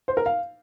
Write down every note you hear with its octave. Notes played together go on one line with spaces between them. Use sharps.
C5
A#4
F5